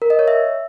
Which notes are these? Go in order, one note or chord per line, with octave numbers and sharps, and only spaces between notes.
A#4
D#5
C#5
E5